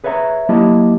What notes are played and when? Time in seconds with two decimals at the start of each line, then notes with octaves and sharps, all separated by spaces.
0.04 G#4 B4 C#5 E5 F5 A#5
0.49 F#3 A#3 E4 G4 D#5 A5